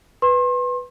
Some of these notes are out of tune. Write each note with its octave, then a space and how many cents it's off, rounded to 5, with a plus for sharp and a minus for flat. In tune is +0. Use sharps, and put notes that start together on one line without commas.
B4 +0 C6 +35